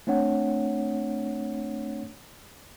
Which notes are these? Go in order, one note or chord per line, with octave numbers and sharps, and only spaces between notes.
A3 C4 D4 C#5 F#5